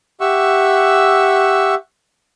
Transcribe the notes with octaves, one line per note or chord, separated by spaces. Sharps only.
G4 E5 F#5 C#6 E6